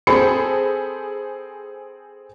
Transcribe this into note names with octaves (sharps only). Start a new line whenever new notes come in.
C4 G#4 A4 C5 B5 C#7